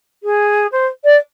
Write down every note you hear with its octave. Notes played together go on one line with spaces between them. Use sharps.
G#4
C5
D5